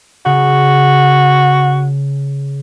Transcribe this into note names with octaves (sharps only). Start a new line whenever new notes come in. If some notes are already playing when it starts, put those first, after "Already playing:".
C#3 F#4